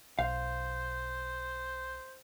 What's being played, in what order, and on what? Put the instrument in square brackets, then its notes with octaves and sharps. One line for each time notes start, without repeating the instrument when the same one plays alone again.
[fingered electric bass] B1 [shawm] C5 [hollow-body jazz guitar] F5